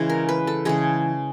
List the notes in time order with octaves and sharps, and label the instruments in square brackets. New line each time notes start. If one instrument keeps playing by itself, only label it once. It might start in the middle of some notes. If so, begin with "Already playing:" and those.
Already playing: [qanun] C#3 E3 G#3
A#4
B4
A4
C#3 E3 G#3 G#4